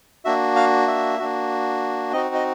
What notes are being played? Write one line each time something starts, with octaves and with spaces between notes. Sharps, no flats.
A#3 D4 F#4 E5
F5
E5
A#3 D4 F#4
C4 D#4 F#4 D#5
D#5